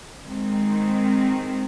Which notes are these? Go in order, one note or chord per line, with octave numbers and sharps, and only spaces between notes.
D#3 G#3 C4